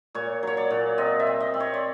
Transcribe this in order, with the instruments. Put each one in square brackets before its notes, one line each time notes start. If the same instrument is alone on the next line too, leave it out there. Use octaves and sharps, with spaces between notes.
[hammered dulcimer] A#2 C#5
F#3 C#5
D5
A#2
C4 D#5
E5
C4
D#5
C4
C#5
D5